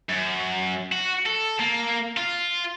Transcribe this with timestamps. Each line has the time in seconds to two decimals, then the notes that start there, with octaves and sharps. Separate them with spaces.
0.10 F#2
0.92 F#4
1.26 A4
1.60 A#3
2.17 F4